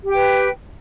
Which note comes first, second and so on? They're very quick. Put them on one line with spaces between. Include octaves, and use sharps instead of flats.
G4 G5 B4